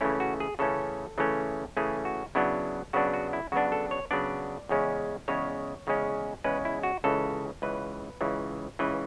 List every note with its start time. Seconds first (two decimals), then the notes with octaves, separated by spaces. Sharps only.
0.01 C#3 E3 A3 C#4 E4
0.20 F#4
0.40 G#4
0.59 C#3 E3 A3 C#4 A4
1.18 C#3 E3 A3 C#4
1.77 C#3 E3 A3 C#4 G#4
2.05 F#4
2.35 C#3 F#3 B3 D4 E4
2.93 C#3 F#3 B3 D4 F#4
3.14 F#4
3.33 E4
3.52 C#3 F#3 B3 D4 F#4
3.72 A4
3.91 C#5
4.11 C#3 F#3 B3 D4 D5
4.69 E2 C#3 G#3 C#4
5.28 E2 C#3 G#3 C#4 C#5
5.87 E2 C#3 G#3 C#4
6.44 E2 C#3 G#3 C#4 B4
6.65 E4
6.83 F#4
7.04 C#2 C#3 E3 A4
7.62 C#2 C#3 E3 B4
8.21 C#2 C#3 E3
8.79 C#2 C#3 E3 B4